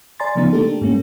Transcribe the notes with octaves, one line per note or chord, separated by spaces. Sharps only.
D5 G#5 A#5 C6 A6
C#3 F3 A3 B3 D#4
A3 A#3 D4 G4 A4
G#2 G3 A#3 C#4